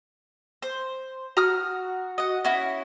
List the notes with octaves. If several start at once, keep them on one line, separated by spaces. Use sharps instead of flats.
C5
F#4 A#5 D#6 F6
D#5 F#5
C#4 E4 F#4